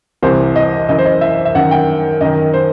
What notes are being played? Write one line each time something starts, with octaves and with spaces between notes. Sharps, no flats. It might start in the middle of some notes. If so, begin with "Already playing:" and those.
C2 C3 E3 C5
D#5
F#2 E3 D#5
C5
D#5
E5
E5
F#2 D#3 F#5
G5
F#2 D#3 D#5
C5